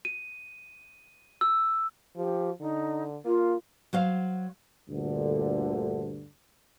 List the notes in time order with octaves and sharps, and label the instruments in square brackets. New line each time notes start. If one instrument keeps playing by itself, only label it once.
[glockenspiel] D#7
E6
[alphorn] F3 [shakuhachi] G4
[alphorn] D3 [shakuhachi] D#4
[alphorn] A#3 [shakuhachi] F4
[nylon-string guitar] F#3 C5 F5
[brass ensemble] D2 G2 A#2 D3